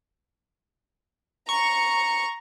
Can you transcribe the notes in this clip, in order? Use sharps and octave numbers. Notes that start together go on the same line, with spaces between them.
A#5 C#6